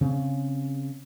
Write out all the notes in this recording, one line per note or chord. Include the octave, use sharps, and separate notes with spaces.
C#3 C4